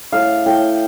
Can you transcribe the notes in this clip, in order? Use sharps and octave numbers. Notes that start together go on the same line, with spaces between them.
A2 F5
A2 G5